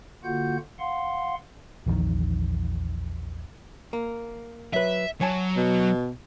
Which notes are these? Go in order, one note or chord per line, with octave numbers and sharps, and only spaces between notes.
D3 A#3 F4 F#4 F#5 G6
F5 F#5 C6
A#1 E2 D#3 F3
A#3
F#3 B4 E5
F#3 C#5 G#5 A5
B2